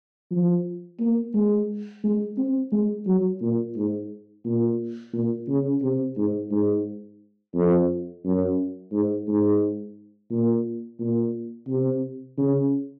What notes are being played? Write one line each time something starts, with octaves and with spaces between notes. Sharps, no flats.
F3
A#3
G#3
G#3
C4
G#3
F#3
A#2
G#2
A#2
A#2
C#3
C3
G#2
G#2
F2
F#2
G#2
G#2
A#2
A#2
C3
C#3